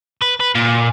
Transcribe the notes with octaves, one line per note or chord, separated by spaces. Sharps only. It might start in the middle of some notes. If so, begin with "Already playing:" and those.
B4
B4
A#2